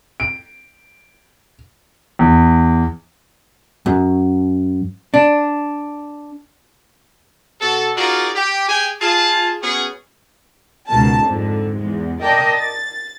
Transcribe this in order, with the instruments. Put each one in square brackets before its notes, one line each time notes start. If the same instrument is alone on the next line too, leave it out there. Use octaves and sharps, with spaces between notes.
[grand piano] D7
E2
[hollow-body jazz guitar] F#2
D4
[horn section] B2 B3 F#4 A4
D#4 F4 F#4 G#4 A#4 D5
G4
G4 G#4 G5 G#5
F4 G#4 A5
B3 C#4 F#4 G#4
[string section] C#2 B2 D#3 A5
F2 G#2 D3
E2 G#3
A#4 D5 D#5 G5 A5
A6